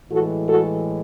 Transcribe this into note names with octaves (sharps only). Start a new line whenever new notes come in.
A2 E3 G#3 F#4 A4
F#4 A4